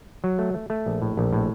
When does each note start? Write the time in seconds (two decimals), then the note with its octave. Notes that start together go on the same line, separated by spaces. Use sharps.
0.24 F#3
0.39 A3
0.54 A3
0.70 A3
0.86 A#1
1.02 A2
1.17 A#1
1.33 A2